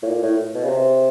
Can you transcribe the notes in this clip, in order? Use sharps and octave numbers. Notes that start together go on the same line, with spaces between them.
A2
A#2
A2
B2
C#3
C3